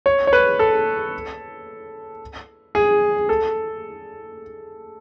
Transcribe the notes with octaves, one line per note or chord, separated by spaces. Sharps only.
C#5
C#5
B4
A4
G#4
A4